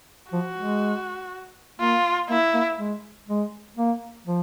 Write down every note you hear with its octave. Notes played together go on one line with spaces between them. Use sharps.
F3 F#4
G#3
A#3 F4
A#3 E4
A#3
G#3
G#3
A#3
F3